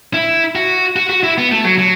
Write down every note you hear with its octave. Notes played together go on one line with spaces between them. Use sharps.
E4
F#4
F#4
F#4
E4
B3
A3
F#3
F#3